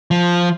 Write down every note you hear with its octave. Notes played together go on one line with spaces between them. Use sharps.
F3